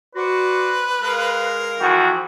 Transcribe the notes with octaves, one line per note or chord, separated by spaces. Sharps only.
F#4 B4 C5 D5
G#3 A#4 F5
F2 E3 F#4 G5